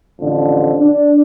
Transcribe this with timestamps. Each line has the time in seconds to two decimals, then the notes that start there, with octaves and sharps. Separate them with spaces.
0.20 A1 F2 D3
0.80 D4